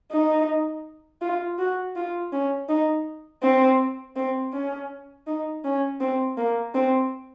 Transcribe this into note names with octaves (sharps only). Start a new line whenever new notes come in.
D#4
F4
F#4
F4
C#4
D#4
C4
C4
C#4
D#4
C#4
C4
A#3
C4